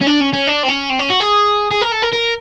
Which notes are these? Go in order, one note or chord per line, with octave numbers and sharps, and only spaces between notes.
C#4
D4
C#4
C#4
D4
C4
C#4
C4
C#4
F#4
G#4
G#4
A#4
A4
A#4
A#4